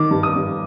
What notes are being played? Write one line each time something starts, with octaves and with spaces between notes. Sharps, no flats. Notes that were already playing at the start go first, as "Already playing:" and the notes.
Already playing: D#3 D6
G2
D#6
G2